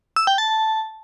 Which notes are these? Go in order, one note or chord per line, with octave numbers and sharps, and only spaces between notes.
E6
G5
A5